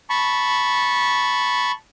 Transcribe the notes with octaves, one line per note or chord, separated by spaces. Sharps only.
A5 B5 C#6